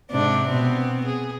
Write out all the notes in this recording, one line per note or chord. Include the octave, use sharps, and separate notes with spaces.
G#2 C3 D4
B2 B3 C4
G#4